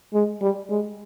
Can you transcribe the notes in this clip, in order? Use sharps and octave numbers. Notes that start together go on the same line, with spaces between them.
G#3
G3
G#3